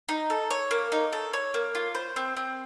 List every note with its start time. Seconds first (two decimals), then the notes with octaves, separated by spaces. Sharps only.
0.09 D#4
0.30 A4
0.51 C#5
0.71 A#3
0.92 D#4
1.13 A4
1.33 C#5
1.54 A#3
1.75 F4
1.95 C5
2.16 C4
2.36 C4